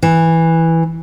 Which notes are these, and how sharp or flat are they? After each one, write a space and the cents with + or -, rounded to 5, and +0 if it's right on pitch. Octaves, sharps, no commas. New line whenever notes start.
E3 -5